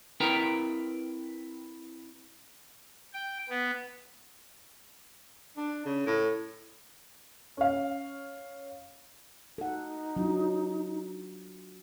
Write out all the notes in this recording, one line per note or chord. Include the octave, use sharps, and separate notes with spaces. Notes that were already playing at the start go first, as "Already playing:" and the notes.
C4 E4 A#4 B4 G5 A#5
G5
B3
D4
C#3
A2
C#4 F5
D#4 A4 F#5
F#3 D4 F4